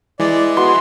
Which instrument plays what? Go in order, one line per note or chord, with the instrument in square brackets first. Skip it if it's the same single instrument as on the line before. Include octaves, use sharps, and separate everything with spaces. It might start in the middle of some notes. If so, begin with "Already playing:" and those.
[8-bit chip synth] E3 G#3 [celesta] E4 [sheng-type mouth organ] D5
[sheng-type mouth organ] B3 [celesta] F#4 [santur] C6